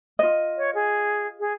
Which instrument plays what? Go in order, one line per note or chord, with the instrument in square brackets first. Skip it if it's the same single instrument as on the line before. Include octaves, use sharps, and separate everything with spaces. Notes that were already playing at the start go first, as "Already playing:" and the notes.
[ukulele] F4 D#5
[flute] C#5
G#4
G#4